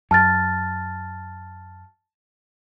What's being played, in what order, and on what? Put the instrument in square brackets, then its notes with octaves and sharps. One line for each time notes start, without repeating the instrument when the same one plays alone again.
[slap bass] F#2 [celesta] A5 F6 A6